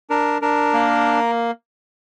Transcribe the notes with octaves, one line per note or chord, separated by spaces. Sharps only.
D4 A#4
D4 A#4
A#3